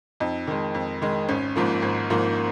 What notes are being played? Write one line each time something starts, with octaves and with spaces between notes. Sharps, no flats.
F2 D#4
D#3 G#3
F2
D#3 G#3
G#1 C#4
G#2 F3 A#3
G#1
G#2 F3 A#3